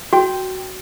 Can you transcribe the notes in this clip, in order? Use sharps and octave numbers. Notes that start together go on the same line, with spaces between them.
F#4 G5